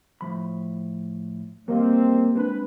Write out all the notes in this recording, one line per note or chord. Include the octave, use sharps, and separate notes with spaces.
A2 F3 B5
E2 G3 A#3 C4 D#5
G#3 C4 D4 B4